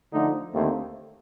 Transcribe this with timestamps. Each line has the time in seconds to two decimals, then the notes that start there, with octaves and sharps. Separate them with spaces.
0.12 D3 F3 A3 D#4
0.53 D#2 D3 A3 C4